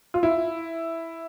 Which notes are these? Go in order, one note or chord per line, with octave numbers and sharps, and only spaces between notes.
F4
E4